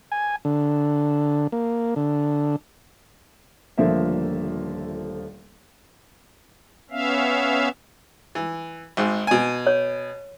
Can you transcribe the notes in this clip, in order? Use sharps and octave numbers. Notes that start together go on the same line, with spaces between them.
G#5
D3
A#3
D3
D#1 D3 F3 A3 A#3 E5
B3 C#4 E5 F5
E3
G#1 G#2
B2 G#5
C#5